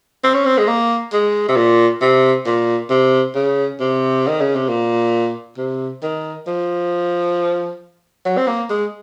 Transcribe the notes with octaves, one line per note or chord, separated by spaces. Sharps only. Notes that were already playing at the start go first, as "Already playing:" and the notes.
C4
C#4
C4
G#3
A#3
G#3
C3
A#2
C3
A#2
C3
C#3
C3
D#3
C#3
C3
A#2
C3
D#3
F3
F#3
C4
A#3
G#3